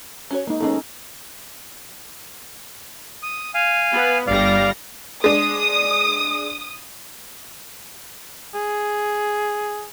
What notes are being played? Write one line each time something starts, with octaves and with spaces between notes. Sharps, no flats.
C#4 F#4 C#5
G#3 A#3 D#4
D#3 G#3 B3 C#4 D#4 A4
D#6
F5 G#5
B3
G1 G3 D5 F5 A#6
G#3 D4 D#6
G#4